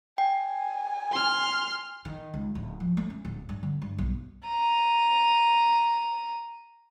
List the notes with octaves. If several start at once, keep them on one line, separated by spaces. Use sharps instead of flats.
G5 G#5
C6 F6
D#3
C#2
D1
F3
A3
C#4
D1
G2
D3
G2
B1
A#5 D#7